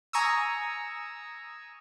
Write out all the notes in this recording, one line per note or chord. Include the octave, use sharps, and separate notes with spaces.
G#5 A#5 C#6 D#6 E6